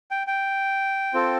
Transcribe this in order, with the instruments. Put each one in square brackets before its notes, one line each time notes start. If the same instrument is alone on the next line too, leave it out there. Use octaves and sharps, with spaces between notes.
[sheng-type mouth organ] G5
G5
C4 F4 A4